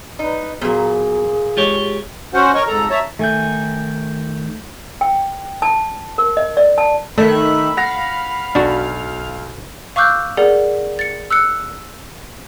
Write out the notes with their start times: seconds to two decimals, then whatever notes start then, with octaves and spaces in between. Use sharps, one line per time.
0.19 D#4 B4
0.61 A#2 F#3 A#3 B3 G#4
1.57 G#3 F4 G4 C#5
2.34 C#4 F#4 C5 F#5
2.54 A#4 C#5 D#5 C#6
2.67 F2 G#2 A4 A#5
2.90 C#5 E5 A5 A#5
3.19 D#3 A3 G#5 G6
5.01 G5
5.62 A5
6.18 A#4
6.37 D#5
6.57 D5
6.78 A5
7.18 D#3 A3 E5 B5 F#6
7.77 F5 F#5 A#6
8.55 B1 D4 F#4
9.96 F5 C#6 D6 E6 F#6 G6
10.37 G#4 A#4 D5 F#5
10.99 A6 C#7
11.31 E6 F#6 C#7